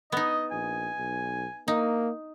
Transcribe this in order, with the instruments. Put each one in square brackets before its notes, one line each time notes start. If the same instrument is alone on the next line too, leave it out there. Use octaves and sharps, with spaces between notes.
[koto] B3 D#4 [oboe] D#5
[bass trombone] A#1 [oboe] G#5
[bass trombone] B1
[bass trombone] A#3 [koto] D#4